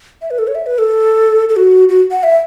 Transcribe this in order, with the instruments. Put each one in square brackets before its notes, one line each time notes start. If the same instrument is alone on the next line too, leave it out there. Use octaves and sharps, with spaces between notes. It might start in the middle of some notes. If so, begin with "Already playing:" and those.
[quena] E5
B4
A4
C#5
E5
B4
A4
A4
F#4
F#4
F#5
E5